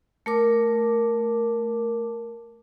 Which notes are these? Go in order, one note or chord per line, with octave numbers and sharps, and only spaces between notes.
A3 A#4 D6